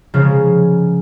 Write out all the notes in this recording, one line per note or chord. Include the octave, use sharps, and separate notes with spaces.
C#3 F3 G#3 A#4